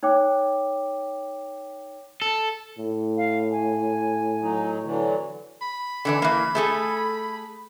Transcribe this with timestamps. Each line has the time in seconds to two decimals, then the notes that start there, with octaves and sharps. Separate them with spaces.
0.03 D#4 C#5 G5 D6
2.22 A4
2.79 A2
3.17 F5
3.52 G#5
4.41 F#3 D#4
4.84 D3 E3 F#3
5.62 B5
6.05 D3 E3 D4
6.22 E3 A#3
6.55 A3 G#4 A4